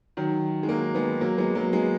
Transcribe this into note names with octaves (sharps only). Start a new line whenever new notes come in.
D#3 F#3
G#3
F#3 A#3
G#3 B3
F#3 A#3
G#3 B3
F#3 A#3
G#3 B3